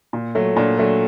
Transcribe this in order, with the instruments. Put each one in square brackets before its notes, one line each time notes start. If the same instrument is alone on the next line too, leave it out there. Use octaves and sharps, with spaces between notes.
[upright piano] A#2
F#3 A3
A#2 D4
F#3 A3